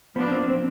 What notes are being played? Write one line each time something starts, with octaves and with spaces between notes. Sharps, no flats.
F3 A#3 B3 D4
C4
C4